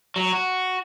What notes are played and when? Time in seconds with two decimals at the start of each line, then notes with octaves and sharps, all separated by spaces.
0.16 F#3
0.32 F#4